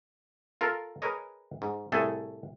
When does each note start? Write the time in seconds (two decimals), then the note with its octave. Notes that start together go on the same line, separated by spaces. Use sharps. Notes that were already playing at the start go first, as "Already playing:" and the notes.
0.61 F4 A4 A#4
1.02 G#4 A#4 B4 C#5 D#5
1.62 G#2
1.92 C2 A2 A3 G#4 A4